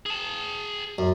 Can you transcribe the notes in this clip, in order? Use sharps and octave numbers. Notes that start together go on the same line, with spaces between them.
G#4 A5
F#2